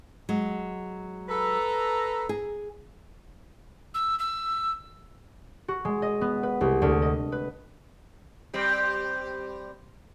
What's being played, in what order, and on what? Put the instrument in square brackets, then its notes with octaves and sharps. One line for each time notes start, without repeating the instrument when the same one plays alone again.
[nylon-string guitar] F#3 G#3
[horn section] A4 B4 A#5
[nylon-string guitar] G#4
[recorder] E6
E6
[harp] F#4
G#3
D#5
B3
B4
C2
D2
D#5
B4
[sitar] G3 C4 G4